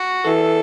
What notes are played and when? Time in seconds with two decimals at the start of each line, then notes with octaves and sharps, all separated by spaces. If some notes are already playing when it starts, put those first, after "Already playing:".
Already playing: F#4
0.24 E3 A4